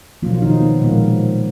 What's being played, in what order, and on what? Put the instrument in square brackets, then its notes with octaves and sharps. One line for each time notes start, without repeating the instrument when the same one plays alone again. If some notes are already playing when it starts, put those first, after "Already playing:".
[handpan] B2 F3 F#3 A#3 F4
F4
D#3 D#4
B3
A#2 F3 G#3 A#3